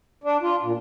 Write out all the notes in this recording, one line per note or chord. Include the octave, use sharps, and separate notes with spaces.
D4
F4
A#2